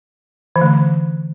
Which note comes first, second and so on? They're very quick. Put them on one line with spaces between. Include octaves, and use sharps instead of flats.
E3 D3 A3